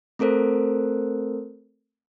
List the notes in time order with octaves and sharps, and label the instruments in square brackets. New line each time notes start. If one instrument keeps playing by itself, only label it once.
[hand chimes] A3 C4 A4 A#4 C5